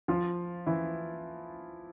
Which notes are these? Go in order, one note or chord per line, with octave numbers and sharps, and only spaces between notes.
F3 F4
E3 E4